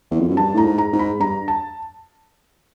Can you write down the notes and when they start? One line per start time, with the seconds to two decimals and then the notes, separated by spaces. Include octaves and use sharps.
0.11 E2
0.20 F2
0.28 F#2
0.37 G2 A5
0.54 A2 A#5
0.65 G#2
0.78 A#5
0.93 G#2
0.99 B5
1.20 G2 A#5
1.48 A5